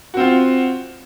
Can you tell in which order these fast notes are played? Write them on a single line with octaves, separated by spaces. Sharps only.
F#4 C4 F4